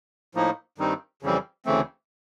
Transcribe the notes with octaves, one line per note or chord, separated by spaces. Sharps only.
A2 F3 A#3 D#4
G2 D#3 G3 C4 D#4
F2 C#3 E3 G3 C4
D2 C#3 E3 A3 C4